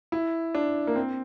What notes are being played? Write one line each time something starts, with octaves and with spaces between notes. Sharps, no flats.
E4
D4
A#3
C4